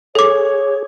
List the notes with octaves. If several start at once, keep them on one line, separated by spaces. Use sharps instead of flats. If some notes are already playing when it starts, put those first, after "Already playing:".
G#4 A4 C#5 D6